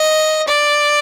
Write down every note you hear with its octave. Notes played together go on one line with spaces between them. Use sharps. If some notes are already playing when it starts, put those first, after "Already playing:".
Already playing: D#5
D5